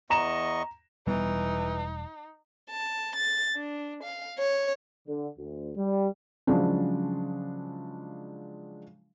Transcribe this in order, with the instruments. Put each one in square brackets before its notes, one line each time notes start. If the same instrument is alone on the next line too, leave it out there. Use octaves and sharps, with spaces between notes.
[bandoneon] E2 D#5 C#6 [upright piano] A#5 E7
[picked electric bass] E1 G3 B3 [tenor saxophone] E3 [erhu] D#4
[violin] A5
A6
D4
F5
C#5
[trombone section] D3
D2
G3
[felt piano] C#3 F3 F#3 G#3 D4